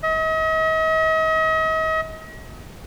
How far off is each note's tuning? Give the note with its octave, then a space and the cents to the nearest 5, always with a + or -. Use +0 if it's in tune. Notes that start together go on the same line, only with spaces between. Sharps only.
D#5 +40